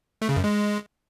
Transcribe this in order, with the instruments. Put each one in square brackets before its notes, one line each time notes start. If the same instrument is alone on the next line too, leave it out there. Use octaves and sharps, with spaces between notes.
[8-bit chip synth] A3
C#3
F#2
G#3